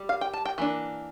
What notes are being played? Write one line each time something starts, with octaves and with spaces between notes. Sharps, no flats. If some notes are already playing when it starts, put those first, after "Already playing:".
Already playing: G3
F5
G5
A5
G5
E3 A#3 D4